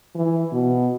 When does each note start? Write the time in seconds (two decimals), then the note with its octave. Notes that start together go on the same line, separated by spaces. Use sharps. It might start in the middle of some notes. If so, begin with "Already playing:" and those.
0.15 E3
0.52 B2